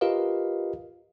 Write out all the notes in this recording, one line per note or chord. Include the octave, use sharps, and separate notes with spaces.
F4 G4 A#4 B4 D#5 F5